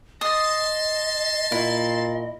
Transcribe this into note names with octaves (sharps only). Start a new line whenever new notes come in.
D#5 A5 C6 D#6
A#2 E4